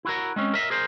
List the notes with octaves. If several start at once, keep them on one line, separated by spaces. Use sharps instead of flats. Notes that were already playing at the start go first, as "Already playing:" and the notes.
E4 F#4 A#4
G#3 C4 C#4
A#4 D#5 E5
G#4 A#4 C5